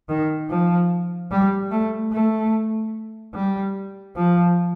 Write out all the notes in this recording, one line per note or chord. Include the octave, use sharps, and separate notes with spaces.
D#3
F3
G3
A3
A3
G3
F3